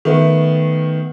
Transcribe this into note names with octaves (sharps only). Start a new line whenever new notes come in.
D#3 A3 B3